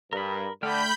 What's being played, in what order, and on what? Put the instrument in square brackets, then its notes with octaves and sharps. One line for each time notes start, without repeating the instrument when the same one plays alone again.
[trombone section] G2 [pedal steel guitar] A#4 B5
[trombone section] D3 [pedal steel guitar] A3 G5 F6 [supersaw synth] B5 G6